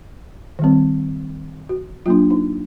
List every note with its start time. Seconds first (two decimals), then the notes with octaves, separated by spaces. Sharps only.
0.59 D#3 G3 C4
1.69 F#4
2.06 F#3 A#3 D4 F4
2.30 D#4